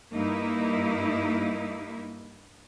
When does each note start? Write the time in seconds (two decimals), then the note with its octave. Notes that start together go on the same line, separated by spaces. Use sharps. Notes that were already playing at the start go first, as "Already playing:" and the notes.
0.12 G2 A#3 D#4 E4